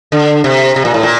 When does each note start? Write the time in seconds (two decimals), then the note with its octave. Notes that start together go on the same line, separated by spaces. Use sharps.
0.12 D3
0.44 C3
0.76 C3
0.85 A#2
0.94 A2
1.03 A#2